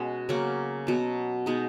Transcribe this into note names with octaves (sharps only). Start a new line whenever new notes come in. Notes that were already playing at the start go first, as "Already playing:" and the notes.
Already playing: B2 G#3 C#4
C#3 F#3 A#3 C#4
B2 F#3 B3
B2 G#3 B3 D#4